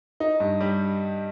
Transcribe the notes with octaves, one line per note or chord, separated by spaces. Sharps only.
D#4
G2
G3